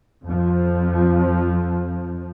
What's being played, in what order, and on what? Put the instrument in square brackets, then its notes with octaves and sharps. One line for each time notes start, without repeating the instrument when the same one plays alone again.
[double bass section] F2 F3